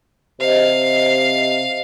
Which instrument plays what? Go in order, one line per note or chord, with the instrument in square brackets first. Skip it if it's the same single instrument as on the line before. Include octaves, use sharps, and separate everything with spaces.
[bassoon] C3 [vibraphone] G4 C5 D#5 [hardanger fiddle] F5